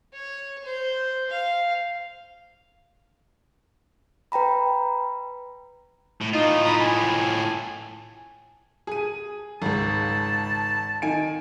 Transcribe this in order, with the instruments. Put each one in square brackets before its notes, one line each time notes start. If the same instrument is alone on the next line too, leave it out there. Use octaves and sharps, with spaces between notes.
[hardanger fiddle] C#5
C5
F5
[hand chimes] B4 G5 A#5 B5
[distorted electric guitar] A2
[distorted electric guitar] A2 F4 [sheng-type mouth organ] D#4
[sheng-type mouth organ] A#5 B5 D#6
G#5
[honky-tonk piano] G#4 D#7
[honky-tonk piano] G#1 C#2 [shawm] A5
[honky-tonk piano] D#3 G#5 D7